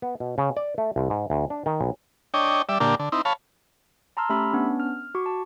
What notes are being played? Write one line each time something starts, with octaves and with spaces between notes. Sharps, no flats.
B3
B2
C#3
D5
A3
C2
G#2
D2
D4
D#3
B1
D4 C#5 D#5 G5
G3 D5 E5
A#2 D3 A#3 D4 G4
D3
C4 D#4 E4
C#5 F5 A5 B5
A5 A#5 C6 E6 F6
A3 C#4 G4 B5 E6
B3 C#4 D4
F6
F#4 C#6 D6
A5